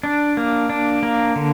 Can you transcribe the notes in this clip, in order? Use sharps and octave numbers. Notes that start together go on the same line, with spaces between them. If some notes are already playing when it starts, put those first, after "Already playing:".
D4
A#3
D4
A#3
D3